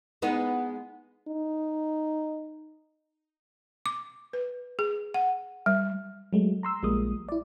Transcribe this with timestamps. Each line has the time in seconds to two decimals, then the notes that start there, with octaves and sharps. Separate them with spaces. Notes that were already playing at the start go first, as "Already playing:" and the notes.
0.22 G#3 B3 D#4
1.28 D#4
3.86 D6
4.33 B4
4.79 G#4
5.14 F#5
5.66 G3
6.33 F#3 G#3 A3
6.63 A#5 C6 E6
6.83 A#1 F3 G3 G#3 A#3 D#6
7.29 E4 D5